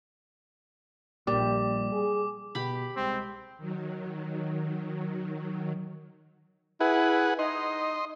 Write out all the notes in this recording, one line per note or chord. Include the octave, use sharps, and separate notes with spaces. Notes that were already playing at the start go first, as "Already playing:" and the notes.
A#1 A#2 G3 D6
G#4
B2 G4 B5
C2 G#3 C4
D#3 F#3
E4 G#4 B4 F#5
D#4 D#5 C6